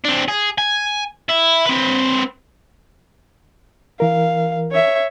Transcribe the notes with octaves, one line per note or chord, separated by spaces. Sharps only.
C4 D4
G#4
G#5
E4
C4 B4
E3 A#4 F5
C#5 E5